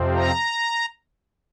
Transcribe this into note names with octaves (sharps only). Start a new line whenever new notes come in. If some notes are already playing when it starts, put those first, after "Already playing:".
Already playing: F2 C3 F3 C4
A#5